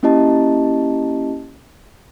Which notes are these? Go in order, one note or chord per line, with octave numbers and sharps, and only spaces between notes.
A#3 C#4 E4 G4 D#5 A5